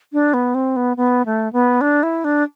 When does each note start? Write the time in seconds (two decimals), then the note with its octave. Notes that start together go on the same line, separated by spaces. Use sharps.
0.13 D4
0.34 B3
0.55 C4
0.76 B3
0.97 B3
1.26 A3
1.53 B3
1.81 D4
2.03 E4
2.24 D4